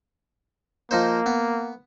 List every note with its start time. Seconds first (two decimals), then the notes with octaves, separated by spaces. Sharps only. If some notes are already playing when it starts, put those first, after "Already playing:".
0.91 F3 A#3 D#4 C5
1.26 B3